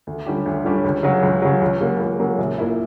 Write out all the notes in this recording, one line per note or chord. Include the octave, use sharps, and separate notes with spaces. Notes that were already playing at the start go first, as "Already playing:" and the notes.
D2
D3 G3 C#4 G4
D2
D3 G3 C#4 G4
C#2
C#3 F#3
C#2
C#3 F#3
C#2
C#3 F#3 A#3
C#2
C#3 F#3 A#3
A#1
A#2 A#3 E4